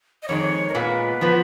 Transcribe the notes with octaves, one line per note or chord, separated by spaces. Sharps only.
D#5
F2 D#3 G#3 C#5
A#4
A#2 G#3 B3 B4
F3 B3